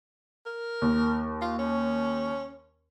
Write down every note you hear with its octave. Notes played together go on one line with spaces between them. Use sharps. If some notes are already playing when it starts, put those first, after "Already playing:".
A#4
D#2
F4
C#4